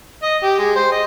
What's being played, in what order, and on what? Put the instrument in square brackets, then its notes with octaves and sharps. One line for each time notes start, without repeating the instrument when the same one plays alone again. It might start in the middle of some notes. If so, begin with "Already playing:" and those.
[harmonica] D#5
G4
G#3
C5
D#5